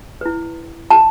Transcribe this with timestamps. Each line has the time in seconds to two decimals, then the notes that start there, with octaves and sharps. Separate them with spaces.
0.21 E4 B4
0.91 A5